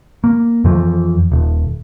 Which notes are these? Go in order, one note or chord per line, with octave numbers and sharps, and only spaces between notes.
A#3
F2 E3 F3
D#1